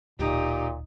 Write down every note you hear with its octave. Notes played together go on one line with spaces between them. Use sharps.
D1 A#2 D#4 G4